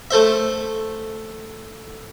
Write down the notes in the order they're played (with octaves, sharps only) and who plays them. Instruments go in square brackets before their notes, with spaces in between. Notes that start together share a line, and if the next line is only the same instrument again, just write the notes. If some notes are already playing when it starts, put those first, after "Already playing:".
[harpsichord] A3 A4 C5 E5